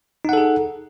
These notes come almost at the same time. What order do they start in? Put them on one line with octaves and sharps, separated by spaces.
D#4 F#5 A4 G#4